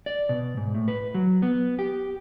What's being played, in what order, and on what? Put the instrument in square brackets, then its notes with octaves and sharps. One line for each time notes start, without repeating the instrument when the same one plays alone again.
[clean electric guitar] D5
B2
G#2
A2
B4
F#3
B3
G4